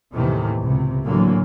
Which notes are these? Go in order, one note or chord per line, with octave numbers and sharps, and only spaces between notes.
D#2 A2 C3 D#3 E3
C#2 C3
A2 D3 E3 F#3 G#3 A#3